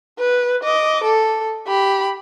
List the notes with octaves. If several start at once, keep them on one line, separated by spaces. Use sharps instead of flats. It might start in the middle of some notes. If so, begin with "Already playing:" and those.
B4
D#5 D6
A4
G4 B5